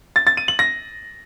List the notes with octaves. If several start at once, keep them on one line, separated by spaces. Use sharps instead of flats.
A6
A6
D#7
F#7
A#6